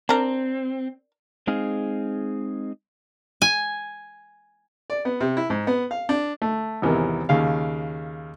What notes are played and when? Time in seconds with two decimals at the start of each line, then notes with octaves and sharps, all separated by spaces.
0.09 C4 D4 A#4
1.47 G#3 C4 D#4 G#4 F5
3.42 G#5
4.90 D5
5.05 B3
5.20 C3
5.37 E4
5.50 G#2
5.67 B3
5.91 F5
6.09 D4
6.42 A3
6.82 G#1 E2 C3 A#4
7.29 D#2 C#3 F5